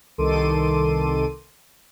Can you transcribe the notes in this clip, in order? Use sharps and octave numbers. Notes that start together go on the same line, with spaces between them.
C2 D#3 A4 C6 D6 D#7